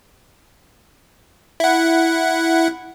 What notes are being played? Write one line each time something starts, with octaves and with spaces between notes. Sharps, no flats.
E4 F#5